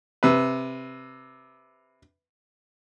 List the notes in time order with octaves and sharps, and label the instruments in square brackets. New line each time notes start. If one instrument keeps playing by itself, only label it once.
[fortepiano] C3 B4